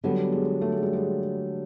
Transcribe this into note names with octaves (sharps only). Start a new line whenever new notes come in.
D3 F#3 G3 B3
G#3
A3
G#3
G3
G#3